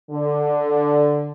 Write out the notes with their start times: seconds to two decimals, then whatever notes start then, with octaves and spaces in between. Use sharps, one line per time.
0.11 D3